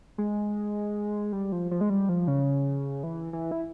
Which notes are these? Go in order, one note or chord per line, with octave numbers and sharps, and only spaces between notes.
G#3
G3
F3
F3
G#3
G3
F3
C#3
E3
E3
E4